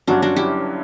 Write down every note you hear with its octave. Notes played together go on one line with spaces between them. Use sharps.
G1 G2 F#3 C#4 D4 F#4
D4 F#4
E4 G4